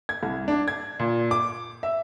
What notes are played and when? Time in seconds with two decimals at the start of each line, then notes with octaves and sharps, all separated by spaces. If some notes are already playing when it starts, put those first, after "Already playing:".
0.09 G#6
0.23 C2
0.48 D4
0.68 G#6
0.99 A#2
1.31 D6
1.83 E5